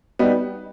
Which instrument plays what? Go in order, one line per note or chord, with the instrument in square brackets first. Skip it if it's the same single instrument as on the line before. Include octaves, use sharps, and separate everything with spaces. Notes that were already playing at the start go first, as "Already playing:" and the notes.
[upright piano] G3 B3 D#4